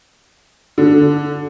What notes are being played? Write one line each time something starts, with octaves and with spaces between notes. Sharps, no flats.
D3